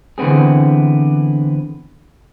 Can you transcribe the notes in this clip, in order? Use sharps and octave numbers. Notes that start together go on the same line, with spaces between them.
D3 E3 B3 C4 G#4